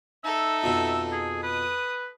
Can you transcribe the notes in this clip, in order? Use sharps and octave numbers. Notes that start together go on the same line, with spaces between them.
D#4 A4 E5
F2 B2
G#4
B4 D#6